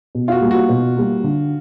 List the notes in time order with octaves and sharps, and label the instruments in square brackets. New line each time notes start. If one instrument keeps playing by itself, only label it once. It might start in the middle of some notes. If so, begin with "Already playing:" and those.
[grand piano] B2
[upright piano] F4
F#4
[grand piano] G3 A#3
[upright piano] F#4
[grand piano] B2
G3 A#3
D3